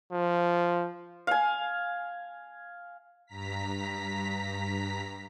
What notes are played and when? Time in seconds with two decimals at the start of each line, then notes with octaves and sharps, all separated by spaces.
0.12 F3
1.27 F5 G#5
3.26 G2 A#5 B6